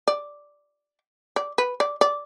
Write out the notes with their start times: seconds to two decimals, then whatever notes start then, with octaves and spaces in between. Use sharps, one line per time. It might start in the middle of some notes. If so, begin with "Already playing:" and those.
0.07 D5
1.36 D5
1.58 B4
1.80 D5
2.01 D5